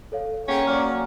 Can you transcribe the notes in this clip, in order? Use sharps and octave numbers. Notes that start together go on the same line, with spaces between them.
A4 C#5 F5
A#3 C#4 G#4 C#5 F#5 G5 B6
F#3 D5 F6